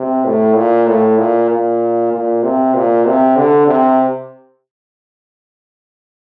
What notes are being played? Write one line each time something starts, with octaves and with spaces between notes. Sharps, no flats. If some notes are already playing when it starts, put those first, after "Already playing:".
Already playing: C3
A2
A#2
A2
A#2
A#2
A#2
C3
A#2
C3
D3
C3